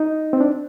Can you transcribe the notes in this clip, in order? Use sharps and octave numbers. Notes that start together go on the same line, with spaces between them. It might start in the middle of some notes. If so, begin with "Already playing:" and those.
Already playing: D#4
C4
D4